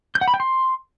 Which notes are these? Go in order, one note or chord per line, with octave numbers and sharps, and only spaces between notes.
G6
F#5
B5
G5
C6